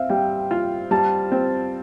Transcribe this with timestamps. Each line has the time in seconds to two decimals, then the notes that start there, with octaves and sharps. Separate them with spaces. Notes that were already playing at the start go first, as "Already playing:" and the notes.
Already playing: C4 E5 F5
0.09 G3 G5
0.51 F4
0.91 G3 A5
1.32 C4